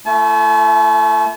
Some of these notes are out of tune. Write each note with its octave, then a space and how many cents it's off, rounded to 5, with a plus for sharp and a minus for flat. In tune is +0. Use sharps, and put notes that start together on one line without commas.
A3 +10 E4 +40 A5 -45